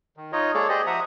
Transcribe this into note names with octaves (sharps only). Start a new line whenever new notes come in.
D#3
D#4 F4 C#5 D#5
G#3 A#3 G#4 A4 C#5 D5
G4 G#4 C5 D5 D#5
F3 E5 F#5 A#5 D#6